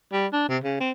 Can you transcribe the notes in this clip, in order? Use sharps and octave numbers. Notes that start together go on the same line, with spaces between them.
G3
D4
C3
C#3
C4